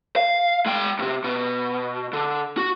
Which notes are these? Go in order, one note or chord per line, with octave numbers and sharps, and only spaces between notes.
F5
G#3 G5
D#2 C3
B2
D3
F#4